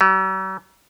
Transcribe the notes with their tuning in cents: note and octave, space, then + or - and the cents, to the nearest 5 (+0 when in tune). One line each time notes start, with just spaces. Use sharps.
F#3 +45